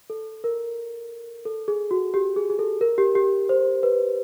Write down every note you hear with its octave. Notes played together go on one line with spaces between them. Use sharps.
A4
A#4
A4
G#4
F#4
G4
G#4
G#4
A4
A#4
G4
G4
C5
B4